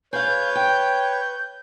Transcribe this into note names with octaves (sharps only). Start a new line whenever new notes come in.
G#4 B4 C#5 F5 G6
G5